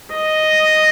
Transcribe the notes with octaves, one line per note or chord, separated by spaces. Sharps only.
D#5